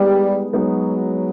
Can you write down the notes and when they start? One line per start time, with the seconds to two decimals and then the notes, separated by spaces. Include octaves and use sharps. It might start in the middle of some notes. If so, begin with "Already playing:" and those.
Already playing: G3 G#3 B3 D#4
0.53 F#3 G#3 B3 D#4